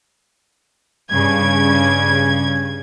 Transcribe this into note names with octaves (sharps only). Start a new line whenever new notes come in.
G2 C#3 G#6